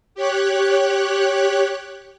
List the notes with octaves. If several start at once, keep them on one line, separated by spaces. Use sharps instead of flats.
G4 C#5 F#6